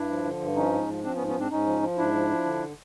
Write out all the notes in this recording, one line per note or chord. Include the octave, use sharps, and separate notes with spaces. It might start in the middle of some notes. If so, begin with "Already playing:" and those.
Already playing: G2 D4 E4
F3
D3
G2
F3 C#4 D#4
G#2
F3
F3 C4 D4
B3 C#4
G#2
B3 C#4
G#2 C4 D4
G#2 C#4 D#4
F3
F3
G#2 D4 E4
F3
F3
D3